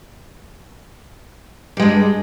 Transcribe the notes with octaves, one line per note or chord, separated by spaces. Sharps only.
G2 G3 G#3